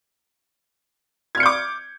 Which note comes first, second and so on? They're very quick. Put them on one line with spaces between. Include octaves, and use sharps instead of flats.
G#6 F6 C#7 G6 D6